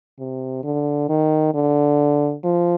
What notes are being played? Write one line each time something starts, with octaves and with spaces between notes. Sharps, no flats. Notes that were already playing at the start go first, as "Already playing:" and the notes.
C3
D3
D#3
D3
F3